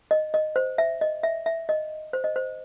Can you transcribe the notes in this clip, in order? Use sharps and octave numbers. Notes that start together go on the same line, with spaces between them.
D#5
D#5
C5
E5
D#5
E5
E5
D#5
C5
D#5
C5